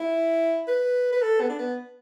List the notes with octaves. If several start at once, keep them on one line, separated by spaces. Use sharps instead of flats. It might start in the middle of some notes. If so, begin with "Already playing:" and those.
Already playing: E4
B4
B4
A4
B3
D4
B3